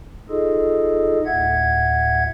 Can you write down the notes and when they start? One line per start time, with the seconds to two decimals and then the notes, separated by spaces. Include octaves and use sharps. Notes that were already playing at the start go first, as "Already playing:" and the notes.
0.30 D#4 F4 G#4 A4 D#5
1.26 D2 A2 E5 F#5 G#6